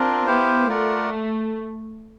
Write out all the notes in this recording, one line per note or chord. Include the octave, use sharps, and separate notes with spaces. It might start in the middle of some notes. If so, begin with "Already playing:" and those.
Already playing: C4 D4 F4 A#4
B3 E4 G4 C5 F5
A3 F4 A#4 D5 F#5